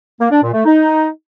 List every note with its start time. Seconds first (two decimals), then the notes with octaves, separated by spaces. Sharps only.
0.20 A#3
0.31 D4
0.42 A#2
0.54 A3
0.65 D#4